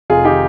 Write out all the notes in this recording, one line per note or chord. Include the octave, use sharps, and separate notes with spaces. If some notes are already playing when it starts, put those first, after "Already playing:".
F1 F4 G#4
D#3 D#4 G4